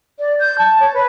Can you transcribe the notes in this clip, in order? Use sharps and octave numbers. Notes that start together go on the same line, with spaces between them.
D5
G6
A5
C#5
B4